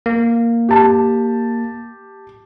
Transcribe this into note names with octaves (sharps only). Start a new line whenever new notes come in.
A#3
G4 A5